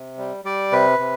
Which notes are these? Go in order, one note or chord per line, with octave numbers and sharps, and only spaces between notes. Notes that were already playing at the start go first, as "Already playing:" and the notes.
Already playing: C3
G3
G3 D5
C3 B4
C3